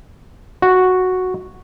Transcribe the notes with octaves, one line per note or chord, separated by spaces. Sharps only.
F#4